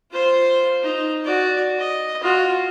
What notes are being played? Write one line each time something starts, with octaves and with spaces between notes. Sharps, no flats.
F4 C5
D#4
F#4 D5
D#5
F4 F#4